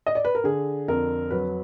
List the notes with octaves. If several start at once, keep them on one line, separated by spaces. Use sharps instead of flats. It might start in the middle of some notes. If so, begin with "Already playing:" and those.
D#5
D5
B4
A#4
D3 G#4
F2 A#4
F#3 B4